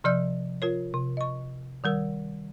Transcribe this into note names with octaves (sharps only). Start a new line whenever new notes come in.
C3 F3 D5 E6 G6
F4 A#4 C#5
C3
D#5 C#6
D#3 G3 A#4 E6